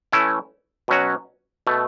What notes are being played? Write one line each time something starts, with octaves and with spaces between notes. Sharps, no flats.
E3 A3 C#4 E4
B2 F#3 C#4 F#4
B2 A3